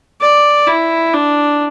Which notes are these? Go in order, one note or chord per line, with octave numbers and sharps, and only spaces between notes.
D5
E4
D4